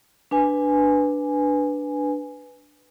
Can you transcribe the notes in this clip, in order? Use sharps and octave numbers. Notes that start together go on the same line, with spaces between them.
D4 B4 G#5